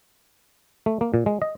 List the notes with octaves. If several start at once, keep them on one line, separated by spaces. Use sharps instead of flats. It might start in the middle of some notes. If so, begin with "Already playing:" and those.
A3
A#3
A#2
G#3
D#5